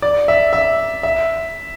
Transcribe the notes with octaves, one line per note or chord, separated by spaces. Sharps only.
D5
E5
E5
E5